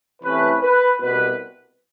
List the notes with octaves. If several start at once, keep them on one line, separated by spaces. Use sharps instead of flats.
C3 E3 A3 C#4 B4
B4
C2 B2 B4